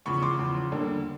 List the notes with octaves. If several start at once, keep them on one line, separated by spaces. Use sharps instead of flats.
E2 C#3 F3 B5 C#6
C6 D6
E2 C#3 F3
D3 G3 A#3 D4